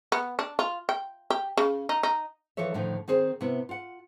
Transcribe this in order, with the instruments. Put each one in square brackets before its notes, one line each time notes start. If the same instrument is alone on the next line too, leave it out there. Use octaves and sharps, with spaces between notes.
[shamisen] B3
D4
F4
G5
G4
C#3
D#4
D#4
[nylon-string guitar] E3 F3 A4 C#5 E5
A2 D3 D#3 F3
D#3 C4 G#4 C5
C3 B3 E4
F4 F#5